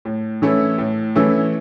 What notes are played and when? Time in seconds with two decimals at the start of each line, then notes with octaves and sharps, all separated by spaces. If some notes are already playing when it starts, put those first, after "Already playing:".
0.05 A2
0.42 E3 A3 C#4 E4
0.78 A2
1.15 E3 A3 C#4 E4